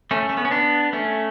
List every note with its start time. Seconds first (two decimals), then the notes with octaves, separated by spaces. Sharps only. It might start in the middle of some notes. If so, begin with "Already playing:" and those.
0.11 A3 C#4
0.29 A3
0.37 B3
0.45 C#4
0.51 B3 D4
0.93 A3 C#4